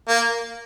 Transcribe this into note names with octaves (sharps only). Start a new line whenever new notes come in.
A#3